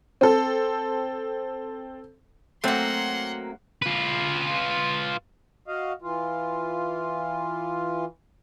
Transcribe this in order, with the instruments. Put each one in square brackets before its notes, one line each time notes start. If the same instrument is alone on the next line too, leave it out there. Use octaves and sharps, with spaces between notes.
[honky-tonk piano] C4 A4
[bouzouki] F#3 A#3 [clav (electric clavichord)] A3 C4 [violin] F#5 C6
[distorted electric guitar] F4 B4
[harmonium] F#4 D#5 F5
E3 F4